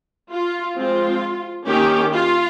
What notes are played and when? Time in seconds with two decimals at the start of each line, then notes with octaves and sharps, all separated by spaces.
0.31 F4
0.76 F3 G#3 C4 F4
1.67 D#3 A#3 C#4 G4
2.13 F4